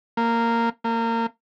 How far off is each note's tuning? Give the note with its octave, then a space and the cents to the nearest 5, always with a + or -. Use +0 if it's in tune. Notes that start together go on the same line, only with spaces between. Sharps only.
A#3 -10
A#3 -25